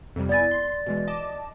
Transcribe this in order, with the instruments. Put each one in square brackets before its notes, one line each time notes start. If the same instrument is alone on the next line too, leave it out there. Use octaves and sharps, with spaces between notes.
[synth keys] F2 C3 G3
[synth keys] B3 E4 G#5 [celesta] D5 A6
[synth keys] C6
B2 E3 G#3
D#5 A5 D6